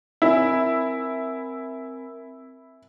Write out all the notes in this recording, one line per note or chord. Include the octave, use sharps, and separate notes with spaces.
C4 E4 A#4 G#5